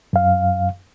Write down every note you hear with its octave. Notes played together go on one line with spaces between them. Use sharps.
F#2 F5